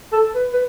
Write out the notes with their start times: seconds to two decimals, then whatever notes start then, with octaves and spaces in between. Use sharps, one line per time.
0.12 A4
0.35 B4
0.53 B4